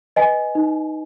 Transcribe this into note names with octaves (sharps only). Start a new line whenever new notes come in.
B4 D#5 G#5
D#4